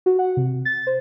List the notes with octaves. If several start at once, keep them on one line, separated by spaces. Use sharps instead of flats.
F#4
F#5
C3
A6
C5